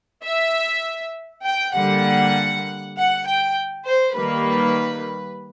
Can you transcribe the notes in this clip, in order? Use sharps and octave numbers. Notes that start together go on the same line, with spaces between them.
E5
G5
D3 G3 A#3 F#5
F#5
G5
C5
D#3 G3 A#3 B4